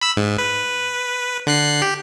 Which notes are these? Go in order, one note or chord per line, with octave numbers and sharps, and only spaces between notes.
B5 E6
G#2
B4
D3 F#6 C7
G4